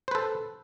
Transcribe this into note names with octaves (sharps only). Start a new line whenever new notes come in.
A4 B4 C5